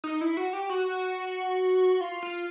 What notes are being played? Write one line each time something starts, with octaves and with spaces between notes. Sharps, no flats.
D#4
E4
F#4
G4
F#4
F4
F4